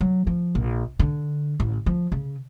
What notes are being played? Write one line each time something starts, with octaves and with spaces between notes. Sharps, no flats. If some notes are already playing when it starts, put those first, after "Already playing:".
F#3
F3
A#1
D3
A1
F3
C#3